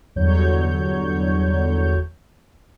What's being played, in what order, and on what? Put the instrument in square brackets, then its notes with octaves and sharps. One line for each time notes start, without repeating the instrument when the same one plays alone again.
[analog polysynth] G1 E2 D3 F#3 C#5 G6